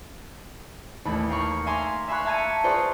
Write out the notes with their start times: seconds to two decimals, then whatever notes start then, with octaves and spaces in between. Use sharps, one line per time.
1.05 A1 D#2 A3 B5
1.29 F5 G5 A#5 B5 C#6
1.66 E5 F5 G#5 A#5 C6 D6
2.08 E5 F5 G#5 B5 C#6 F#6
2.25 E5 A5 A#5 G#6 C#7 D#7
2.64 F4 G#4 B4 C5 D5 C#6